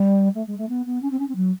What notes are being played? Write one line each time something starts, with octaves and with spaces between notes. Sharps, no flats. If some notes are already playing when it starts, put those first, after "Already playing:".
Already playing: G3
A3
G#3
A3
B3
B3
C#4
C4
C#4
C4
F#3